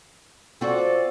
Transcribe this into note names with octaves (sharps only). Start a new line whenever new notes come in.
C4 F4 F#4 A4 D5